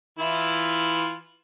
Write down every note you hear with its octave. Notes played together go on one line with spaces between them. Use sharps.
E3 E4 F4